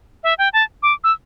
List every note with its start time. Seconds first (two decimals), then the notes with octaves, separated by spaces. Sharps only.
0.23 E5
0.38 G5
0.53 A5
0.83 D6
1.04 E6